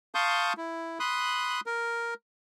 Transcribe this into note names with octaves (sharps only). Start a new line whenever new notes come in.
F5 A5 C6 C#6 D#6 G6
E4
B5 C6 D#6 F#6
A#4